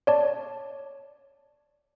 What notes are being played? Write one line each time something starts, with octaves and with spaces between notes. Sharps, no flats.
C#5 D5 A5